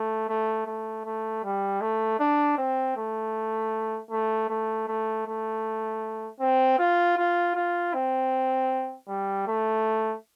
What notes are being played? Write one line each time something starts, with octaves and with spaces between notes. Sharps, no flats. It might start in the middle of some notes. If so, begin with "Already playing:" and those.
Already playing: A3
A3
A3
A3
G3
A3
D4
C4
A3
A3
A3
A3
A3
C4
F4
F4
F4
C4
G3
A3